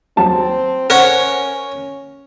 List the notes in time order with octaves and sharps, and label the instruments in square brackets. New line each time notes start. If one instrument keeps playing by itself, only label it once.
[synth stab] D#2 F#3 [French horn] C4 [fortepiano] A5
[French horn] C#4 [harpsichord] A#4 C#5 [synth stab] C5 F#5